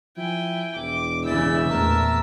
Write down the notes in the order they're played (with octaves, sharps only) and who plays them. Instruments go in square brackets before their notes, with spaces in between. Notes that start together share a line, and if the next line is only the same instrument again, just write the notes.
[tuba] F3 [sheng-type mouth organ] E4 [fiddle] G5 G#5
[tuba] E1 [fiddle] D6
[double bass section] C#3 E3 [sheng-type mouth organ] E4 D5 G6 [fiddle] E5 E6
[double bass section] E2 A#2 A3 [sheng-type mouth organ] A#4 A5